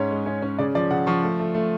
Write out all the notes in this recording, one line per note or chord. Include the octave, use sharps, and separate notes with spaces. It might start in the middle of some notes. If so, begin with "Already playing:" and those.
Already playing: G#2 C#4 C#5
G#3
C#4
C#4
C#3 D5
F3 D5
C#3 F#5
F3 C#6
A3
A3
A3